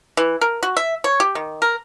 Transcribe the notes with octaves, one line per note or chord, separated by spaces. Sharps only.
E3
A#4
F#4
E5
C#5
G4
D#3
A#4